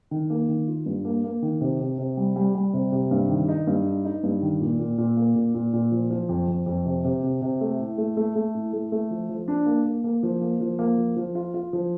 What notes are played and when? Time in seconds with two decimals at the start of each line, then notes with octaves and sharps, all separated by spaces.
0.11 D#3
0.30 A#3
0.49 D#3
0.67 F4
0.86 G2
1.05 A#3
1.24 A#3
1.42 D#3
1.61 C3
1.80 C3
1.98 C3
2.17 G3
2.36 G3
2.55 G3
2.73 C3
2.92 C3
3.11 G2
3.29 D#3
3.48 D#4
3.67 G2
3.86 D#4
4.04 D#4
4.23 G2
4.42 D#3
4.61 A#2
4.79 A#2
4.98 A#2
5.17 A#3
5.36 A#2
5.54 A#2
5.73 A#2
5.92 F3
6.10 F3
6.29 F2
6.48 F2
6.66 F2
6.86 C3
7.04 C3
7.23 C3
7.41 C3
7.61 A3
7.79 A2
7.98 A3
8.17 A3
8.36 A3
8.54 A2
8.73 A3
8.92 A3
9.10 F3
9.29 F3
9.48 D4
9.66 A#3
9.85 A#3
10.04 A#3
10.23 F3
10.41 A#3
10.61 F3
10.79 A#3
10.98 F3
11.16 F3
11.35 F4
11.54 F4
11.73 F3